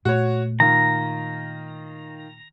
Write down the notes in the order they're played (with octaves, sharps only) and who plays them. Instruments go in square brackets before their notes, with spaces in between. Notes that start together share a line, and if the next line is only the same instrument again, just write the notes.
[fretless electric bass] A#2 A3 [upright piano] F#4 C#5
[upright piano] D#3 F4 [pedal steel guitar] A#5